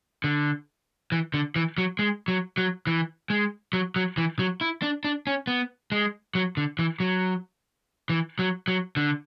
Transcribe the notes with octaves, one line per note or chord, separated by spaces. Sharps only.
D3
E3
D3
E3
F#3
G#3
F#3
F#3
E3
G#3
F#3
F#3
E3
F#3
E4
D4
D4
C#4
B3
G#3
F#3
D3
E3
F#3
E3
F#3
F#3
D3